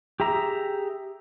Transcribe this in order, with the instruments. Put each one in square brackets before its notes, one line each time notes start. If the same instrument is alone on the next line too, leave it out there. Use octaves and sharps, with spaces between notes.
[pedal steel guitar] G4 G#4 E5 A#5